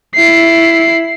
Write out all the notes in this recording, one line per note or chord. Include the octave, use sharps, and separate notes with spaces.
E4 C7